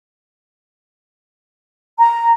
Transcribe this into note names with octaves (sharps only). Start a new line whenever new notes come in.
A#5